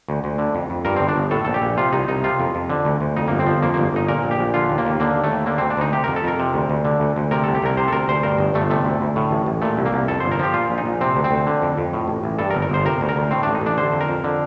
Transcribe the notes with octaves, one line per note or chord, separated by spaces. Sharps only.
D2
D2
D3
F2
F2
G2 A#4
G1 C4
D4
G1
A2 A4
A#1 A4
G4
A#1
C3 F4
C2 D#4
C2 D#4
C3 F4
F2
F2
D3
D2
D2
F2 D#4
G1 A#3
C4
F3
F2 A#3
G1 A#3
G1 D#4
A#2 A#4
A#1
G4
A#1
D3 F4
D#2
A#3
D#2
D3 A#3
D#2
A3
D#2
D3 A#3
D2 C4
D4
D2 D#4
C3 G4
F2 A#4
A4
F2 A#4
C3
D2
D2
D3
D2
D2
C3 A#4
C2 A4
G4
C2 A#4
C3 C5
A4
D2 A#4
D2 C5
G2 A#4
G1
G1 A3
C3 A3
D2
D2
A2
A1
A1
A#2 A3
C2
A#3
C2
F2 A4
G1 C5
A#4
F3 G4
A#2 F4
A#1
D#4
A#1
C3 C4
D2
C4
D2
D3
F2
F2
A2
A1
A1
G2 A4
A#4
G1
A#4
G1 C5
C3 A#4
D2
A#4
D2
A2 C4
A1 D4
D#4
A1 D4
D3 C5
F2
A#4
F2
D3